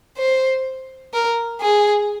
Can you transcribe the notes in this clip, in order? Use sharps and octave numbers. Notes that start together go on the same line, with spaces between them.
C5
A#4
G#4